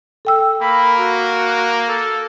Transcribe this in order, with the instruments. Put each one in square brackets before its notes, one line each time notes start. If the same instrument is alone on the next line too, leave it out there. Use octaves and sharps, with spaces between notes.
[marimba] A4 G5 E6
[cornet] A#3 [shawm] B5
[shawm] F#4
A4